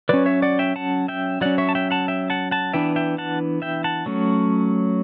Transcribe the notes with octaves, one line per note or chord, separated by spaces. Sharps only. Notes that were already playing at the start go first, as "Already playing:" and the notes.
F#3 C#4 B4 D5
C#5 E5
D5 F#5
E5 G5
F#5 A5
E5 G5
F#3 C#4 D5 F#5
C#5 E5
A5
E5 G5
F#5 A5
E5 G5
F#5 A5
F#5 A5
E3 B3 D4 E5 G5
E5 G5
F#5 A5
E5 G5
F#5 A5
F#3 A3 C#4